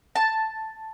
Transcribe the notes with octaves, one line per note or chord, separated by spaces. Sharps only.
A5